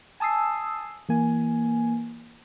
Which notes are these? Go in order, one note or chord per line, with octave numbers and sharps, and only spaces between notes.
G#5 A5 D#6 E6 C7
E3 A#3 G#5